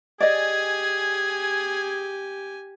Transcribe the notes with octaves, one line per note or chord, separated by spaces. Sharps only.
G4 G#4 D5 D#5 G#5